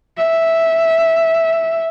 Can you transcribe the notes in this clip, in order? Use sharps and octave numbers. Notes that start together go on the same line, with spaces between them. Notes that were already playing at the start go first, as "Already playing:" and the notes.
E5